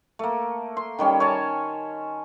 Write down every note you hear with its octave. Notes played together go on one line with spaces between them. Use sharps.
A3 A#3
C6
D#3 G3 C#4
C#5 G#5 A5